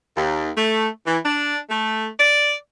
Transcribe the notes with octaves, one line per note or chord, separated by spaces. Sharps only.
D#2
A3
E3
D4
A3
D5